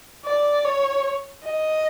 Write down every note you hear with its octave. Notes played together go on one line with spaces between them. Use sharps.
D5
C#5
D#5